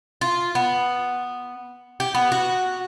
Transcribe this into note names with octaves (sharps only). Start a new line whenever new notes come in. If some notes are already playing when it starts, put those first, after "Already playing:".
F4
B3
G4
B3
F#4